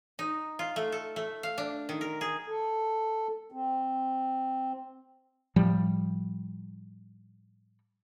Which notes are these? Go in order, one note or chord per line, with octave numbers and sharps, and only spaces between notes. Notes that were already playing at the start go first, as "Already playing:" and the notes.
D#4
F4
A3
A4
A3
F5
D4
D#3
A#4
G#4
A4
C4
A2 F3 G3